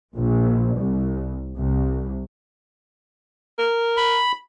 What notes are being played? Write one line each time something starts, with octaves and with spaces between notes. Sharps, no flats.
A#1
C2
C2
A#4
B5